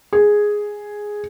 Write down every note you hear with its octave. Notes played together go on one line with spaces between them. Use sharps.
G#4